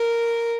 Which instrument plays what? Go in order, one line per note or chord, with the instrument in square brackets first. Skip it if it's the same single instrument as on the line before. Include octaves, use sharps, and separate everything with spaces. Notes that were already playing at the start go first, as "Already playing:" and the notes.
Already playing: [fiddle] A#4